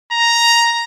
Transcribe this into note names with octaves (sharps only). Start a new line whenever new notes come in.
A#5